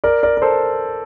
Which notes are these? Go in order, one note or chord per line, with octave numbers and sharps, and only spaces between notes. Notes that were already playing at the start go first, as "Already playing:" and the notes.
A#4 D5
A#4 D5
A#4
A4 C5